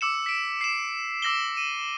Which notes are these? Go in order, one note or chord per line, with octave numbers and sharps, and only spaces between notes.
D6 E6 C#7 E7
B6 D7
C7 E7
D6 E6 A#6 E7 G7
D#7